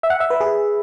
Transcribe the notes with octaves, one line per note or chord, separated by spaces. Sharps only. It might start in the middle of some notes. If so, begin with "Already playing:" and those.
E5
F#5
E5
B4
G#4